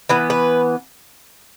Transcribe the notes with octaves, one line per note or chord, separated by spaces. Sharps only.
E3 B3 B4
B4